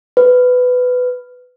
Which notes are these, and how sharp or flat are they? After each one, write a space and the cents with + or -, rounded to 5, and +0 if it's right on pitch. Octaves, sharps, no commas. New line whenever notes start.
B4 +15